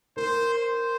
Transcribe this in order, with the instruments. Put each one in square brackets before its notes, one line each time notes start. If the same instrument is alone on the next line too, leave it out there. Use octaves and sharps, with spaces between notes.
[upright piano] A#4 [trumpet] C5
[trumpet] C5